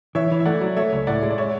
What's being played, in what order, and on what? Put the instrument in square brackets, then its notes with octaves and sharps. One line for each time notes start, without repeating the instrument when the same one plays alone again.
[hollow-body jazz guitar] E3 [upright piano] C#5 E5
[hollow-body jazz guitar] E3
[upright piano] E5
[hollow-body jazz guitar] A3 [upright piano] D5 F#5
[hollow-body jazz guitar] F#3
[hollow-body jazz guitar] A3 [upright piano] C#5 E5
[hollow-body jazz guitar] C#2
[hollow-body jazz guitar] A2 [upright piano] D5 F#5
[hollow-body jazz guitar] G#3
[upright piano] D5
C#5 E5